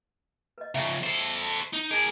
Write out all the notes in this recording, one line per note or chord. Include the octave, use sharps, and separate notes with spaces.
B4 D#5
C#3 F3 C#4 E5 A#5
A4 C5
D#4
G#4 A#4